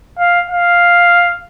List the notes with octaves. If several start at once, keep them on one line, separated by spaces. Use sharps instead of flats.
F5
F5